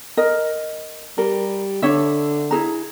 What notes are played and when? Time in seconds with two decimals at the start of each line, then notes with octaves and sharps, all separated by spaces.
0.17 A#4 D#5
1.18 G3 A#4
1.82 D3 D4 C#5 E5
2.51 E4 G#4 A#5